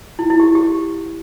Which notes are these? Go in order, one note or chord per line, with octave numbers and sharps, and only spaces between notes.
E4
E4
G4
G4